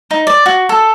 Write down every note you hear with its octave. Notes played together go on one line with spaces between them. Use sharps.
D#4
D5
F#4
A4